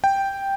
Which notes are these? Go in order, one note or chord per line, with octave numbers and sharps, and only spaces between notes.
G5